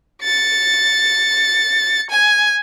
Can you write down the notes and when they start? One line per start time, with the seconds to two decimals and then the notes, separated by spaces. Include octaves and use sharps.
0.24 A6 C#7
2.10 G#5